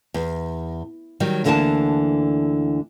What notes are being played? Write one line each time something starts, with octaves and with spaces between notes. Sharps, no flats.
E2
D#3 F#3 G3
D2 D3 E3 A#3 D4 A5